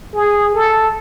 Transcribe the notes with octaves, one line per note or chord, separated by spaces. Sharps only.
G#4
A4